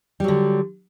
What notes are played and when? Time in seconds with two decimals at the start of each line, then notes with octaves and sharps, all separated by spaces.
0.20 G3
0.24 F#3
0.28 D3